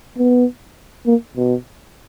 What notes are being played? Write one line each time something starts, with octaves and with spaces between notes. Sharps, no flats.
B3
A#3
B2